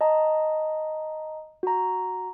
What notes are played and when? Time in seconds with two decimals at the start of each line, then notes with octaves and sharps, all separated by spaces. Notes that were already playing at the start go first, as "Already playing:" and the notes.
0.01 D#5 A5 A#5
1.63 F#4 A#5